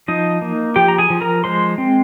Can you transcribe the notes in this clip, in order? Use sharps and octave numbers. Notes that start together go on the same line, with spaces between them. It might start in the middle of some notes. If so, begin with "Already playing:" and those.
F3 D#4 D#5
A#3
F3 G4 G5
A#5
G#4 G#5
F3
A#4 A#5
G#3 C5 C6
C4